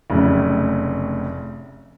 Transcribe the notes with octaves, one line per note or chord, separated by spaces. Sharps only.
F1 F#2 A2 C#3